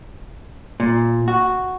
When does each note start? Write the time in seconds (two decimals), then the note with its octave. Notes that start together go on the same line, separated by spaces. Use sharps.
0.80 A#2
1.28 F#4